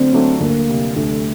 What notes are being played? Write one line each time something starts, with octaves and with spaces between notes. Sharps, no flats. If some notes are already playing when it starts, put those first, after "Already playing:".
Already playing: D3 F#3 A3 C4 D4
F#3 A3 D4
D2 A#3
C3 G3
D2 A3